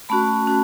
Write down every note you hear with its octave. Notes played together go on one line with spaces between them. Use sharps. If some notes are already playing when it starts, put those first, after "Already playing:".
A3 C#4 F#4 A5 B5
C#4 F#4